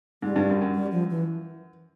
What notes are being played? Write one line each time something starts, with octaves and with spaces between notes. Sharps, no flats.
G#2 G3
G2
F#2
F#2
G3
F3
E3